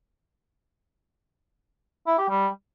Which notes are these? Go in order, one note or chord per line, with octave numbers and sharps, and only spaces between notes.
E4
G4
G3